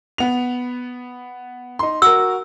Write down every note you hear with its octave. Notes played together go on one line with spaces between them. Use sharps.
B3 F7
D#4 C6
F#4 A#4 E6